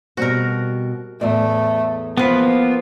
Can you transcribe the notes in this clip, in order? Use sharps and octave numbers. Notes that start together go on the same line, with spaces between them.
B2 G3 C4 F#4 A#4
E2 A2 A3 D5
F3 A#3 B3 F4 B4